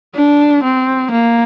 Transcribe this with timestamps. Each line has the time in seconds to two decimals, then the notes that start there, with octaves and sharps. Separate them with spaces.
0.16 D4
0.64 C4
1.11 A#3